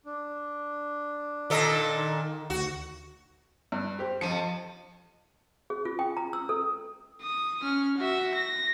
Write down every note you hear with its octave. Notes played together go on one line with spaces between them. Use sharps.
D4
A#2 D#3 A4 D#5
D2 F#4
G2
G4 C5
F2 G#2 F3 C#7 D#7
G#4
F4
G5
A#5
E6
A4
D#6
C#4 F6
F#4 E5
A#6